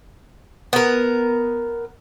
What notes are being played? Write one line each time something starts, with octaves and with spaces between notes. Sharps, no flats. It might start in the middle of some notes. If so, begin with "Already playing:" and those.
B3 A#4